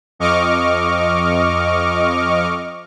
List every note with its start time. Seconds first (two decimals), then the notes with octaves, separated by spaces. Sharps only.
0.19 F2 D#5 C#6 D6 F6